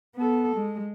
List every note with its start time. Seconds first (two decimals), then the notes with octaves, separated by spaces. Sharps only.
0.16 B3 A4
0.56 G#3